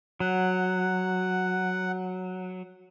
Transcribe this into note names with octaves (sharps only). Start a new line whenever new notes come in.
F#3 F#5